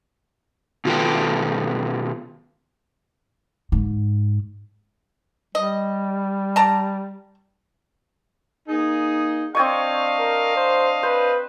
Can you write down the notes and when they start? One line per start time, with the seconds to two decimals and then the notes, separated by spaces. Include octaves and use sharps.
0.85 B2 D#3 F4 A4 B4 G5
3.72 G#2
5.55 G3 D#5
6.56 D5 A5 A#5
8.69 A#3 D#4 G#4
9.55 C4 D4 C#5 D#5 F5 C#6
10.20 A#4
10.56 C5
11.03 B4 C5